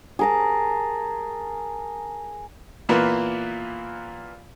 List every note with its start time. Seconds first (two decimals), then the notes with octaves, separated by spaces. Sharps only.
0.19 G#4 A#4 A5
2.89 A#2 E3 A#3 B3